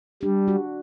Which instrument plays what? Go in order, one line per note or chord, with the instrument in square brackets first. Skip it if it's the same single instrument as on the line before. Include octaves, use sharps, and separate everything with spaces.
[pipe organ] G3 [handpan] D4
[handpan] F#4